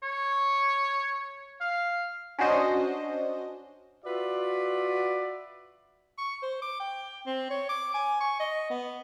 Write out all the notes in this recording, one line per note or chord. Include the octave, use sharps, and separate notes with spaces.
C#5
F5
C#4 D4 F#4 C5 D#5
F4 F#4 B4 D5 E5
C#6
C5
D6
G5
C4
C#5
D6
G#5
C#6
D#5
B3